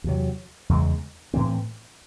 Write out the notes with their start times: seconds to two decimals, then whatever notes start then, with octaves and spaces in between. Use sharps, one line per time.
0.04 E2 C3 F#3
0.69 E2 C#3 G#3
1.34 A2 E3 C4